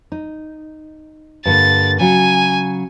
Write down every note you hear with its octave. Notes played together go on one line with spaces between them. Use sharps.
D#4
G2 D3 A#3 A6
C#3 F#3 G#5